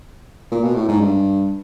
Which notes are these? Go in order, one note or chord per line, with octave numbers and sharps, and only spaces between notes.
A#2
B2
A2
G#2
G2